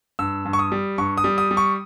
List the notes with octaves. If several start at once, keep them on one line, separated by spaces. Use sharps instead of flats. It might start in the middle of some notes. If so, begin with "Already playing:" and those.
G2 E6
G2
C#6
D#6
G3
G2 C#6
D#6
G3
D#6
G3
C#6